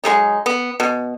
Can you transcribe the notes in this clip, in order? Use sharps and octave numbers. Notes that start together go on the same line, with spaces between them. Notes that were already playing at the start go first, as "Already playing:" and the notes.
F#3 G#3 A3 D#4
B3
B2